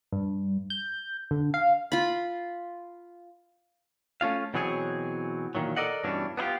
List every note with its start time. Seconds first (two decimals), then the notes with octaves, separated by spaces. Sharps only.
0.12 G2
0.70 G6
1.31 D3
1.54 F5
1.92 F4 B5
4.21 A3 C#4 F4 F5
4.54 B2 E3 F#3 C4 G#4 C#5
5.55 A#2 D#3 E3 F#3
5.77 A4 A#4 D5 D#5 F#5
6.04 G2 B2 E3 C#4 D4
6.37 B3 D4 E4 F4 G4